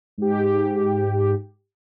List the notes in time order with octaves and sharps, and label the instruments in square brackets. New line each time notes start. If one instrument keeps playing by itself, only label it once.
[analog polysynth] G#2 G4